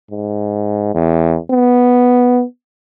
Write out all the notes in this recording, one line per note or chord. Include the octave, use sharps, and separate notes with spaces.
G#2
E2
B3